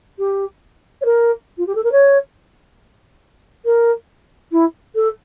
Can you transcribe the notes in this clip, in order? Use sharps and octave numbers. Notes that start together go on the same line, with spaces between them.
G4
C#5
A#4
F4
G4
A4
A#4
C#5
A#4
E4
A4